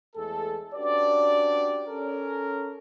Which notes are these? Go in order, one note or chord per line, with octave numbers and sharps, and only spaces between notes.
E2 G#3 A3 G#4 A4
C#4 D4 F#4 G4 B4 D5
C#4 A4 A#4